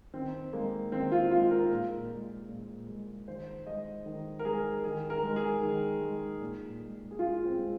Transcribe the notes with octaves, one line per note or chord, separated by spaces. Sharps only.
D#3 C4
G#3 A#3
D#3 C4
F4
G#3 F4
A#4
A#2
G#3
A#2
G#3
D#3 C5
G#3 D#5
D#3
A#4
G#3 G#4
D#3 G#4
A#4
G#3
G#4
D#3
G#3
A#2
G#3
G#4
A#2 F4
C4
G#3